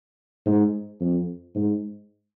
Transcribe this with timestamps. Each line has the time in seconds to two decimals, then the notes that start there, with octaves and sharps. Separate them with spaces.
0.46 G#2
1.00 F2
1.55 G#2